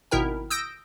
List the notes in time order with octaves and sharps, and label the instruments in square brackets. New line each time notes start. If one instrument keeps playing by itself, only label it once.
[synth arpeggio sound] G#1 B2 E4 A#4 G5
D#6 E6 G6 A#6 D7